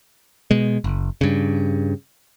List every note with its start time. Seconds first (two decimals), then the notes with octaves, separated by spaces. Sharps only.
0.51 B2 G#3
0.84 F#1
1.21 G2 C#3